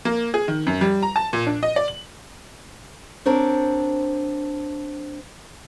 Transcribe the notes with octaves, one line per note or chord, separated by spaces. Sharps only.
A#3
G#4
D#3
F#2
G3
A#5
A5
A#2
D4
D#5
D5
F#7
C4 D4 A#4 C5 C#5